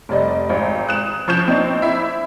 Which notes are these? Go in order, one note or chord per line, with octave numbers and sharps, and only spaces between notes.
F1 G3 D5 D#5
G#1
D#6 F#6 E7
F3 C#6 G6 E7
C4 D4 D#4
E4 E5